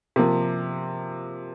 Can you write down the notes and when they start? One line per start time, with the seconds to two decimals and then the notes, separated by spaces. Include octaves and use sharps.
0.16 C3 F3 A#3